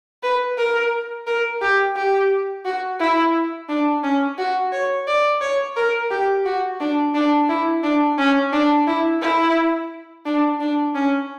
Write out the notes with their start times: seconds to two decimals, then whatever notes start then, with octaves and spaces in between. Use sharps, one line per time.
0.23 B4
0.58 A#4
1.27 A#4
1.61 G4
1.96 G4
2.65 F#4
3.00 E4
3.69 D4
4.04 C#4
4.38 F#4
4.72 C#5
5.07 D5
5.41 C#5
5.76 A#4
6.11 G4
6.45 F#4
6.80 D4
7.14 D4
7.49 E4
7.83 D4
8.18 C#4
8.53 D4
8.87 E4
9.22 E4
10.26 D4
10.60 D4
10.95 C#4